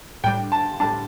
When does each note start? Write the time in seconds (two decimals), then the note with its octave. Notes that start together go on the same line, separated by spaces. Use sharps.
0.24 A2 G3 D4 G5
0.52 A5
0.80 A2 G3 D4 A5